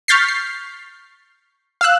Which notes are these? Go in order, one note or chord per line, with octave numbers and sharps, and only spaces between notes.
C#6 F6 G6 A6 B6 C7
C7
F5 E6 F#6